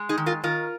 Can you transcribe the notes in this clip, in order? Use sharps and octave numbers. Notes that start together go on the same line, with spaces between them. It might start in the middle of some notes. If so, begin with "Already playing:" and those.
Already playing: G#3
D#4 G#4
D#3
F4 A#4
D#3 F4 A#4